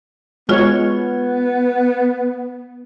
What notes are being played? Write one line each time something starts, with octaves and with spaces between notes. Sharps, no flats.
G#3 B3 F4 F#4 C#5